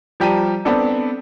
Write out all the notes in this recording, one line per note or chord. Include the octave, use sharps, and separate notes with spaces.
F3 G3 G4 A5 A#5 D#7
B3 C4 D4 A4